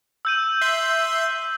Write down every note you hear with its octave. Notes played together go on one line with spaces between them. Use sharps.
E6 G6 D#7
E5 C6